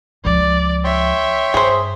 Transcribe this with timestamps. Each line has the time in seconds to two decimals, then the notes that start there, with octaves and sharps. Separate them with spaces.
0.25 C#2 F3 D5
0.84 C#5 E5 G5 C6
1.54 G2 G#4 C5